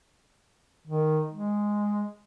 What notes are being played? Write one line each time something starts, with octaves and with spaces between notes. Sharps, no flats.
D#3
G#3